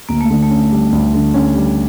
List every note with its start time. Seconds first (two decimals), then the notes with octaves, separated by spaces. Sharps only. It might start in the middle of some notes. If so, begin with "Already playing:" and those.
0.09 D2 A#3
0.21 A3
0.30 D3
0.42 A3
0.50 C#4
0.71 G3
0.92 D2
1.13 D3
1.34 C#4
1.55 G3